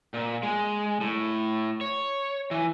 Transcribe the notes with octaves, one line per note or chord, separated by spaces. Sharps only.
A#2
G#3
A2
C#5
E3